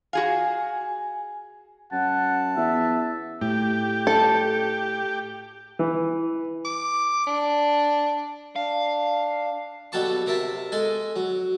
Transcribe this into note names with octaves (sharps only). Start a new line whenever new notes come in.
F#4 G#4 F5 G#5
F#2 F#5 A5
E2 E5
A2 G4
A4
E3
D6
D4
D4 F5
B2 F#3 G3 A4 A5 C#6
C3 A#4 E5 A5
G#3 A4 G#5
F#3